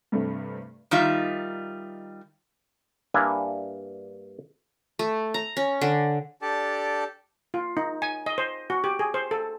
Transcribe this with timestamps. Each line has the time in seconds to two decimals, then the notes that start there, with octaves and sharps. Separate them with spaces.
0.12 G2 C3 G3 A3 C4 D4
0.91 D#3 G3 D#4 F4 E5
3.14 G2 A#3 D4 E4 G#5
4.99 A3
5.34 A#5
5.57 C#4
5.81 D3
6.42 D4 G4 A4 D5 A5
7.54 F4
7.77 D#4
8.02 G#5
8.26 D#5
8.38 C5
8.70 F#4
8.84 G4
8.99 G#4
9.14 C5
9.31 A4